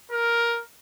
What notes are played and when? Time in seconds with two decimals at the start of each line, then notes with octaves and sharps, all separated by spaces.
0.11 A#4